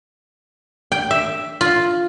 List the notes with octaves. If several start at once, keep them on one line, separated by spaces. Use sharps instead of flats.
G5
E5
F4